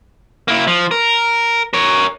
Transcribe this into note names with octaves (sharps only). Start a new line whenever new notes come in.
A#3 E4
F3
A#4
A#4 C#5